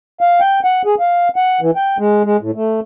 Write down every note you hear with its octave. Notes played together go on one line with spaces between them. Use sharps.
F5
G5
F#5
G#4
F5
F#5
E3
G5
G#3
G#3
A2
A3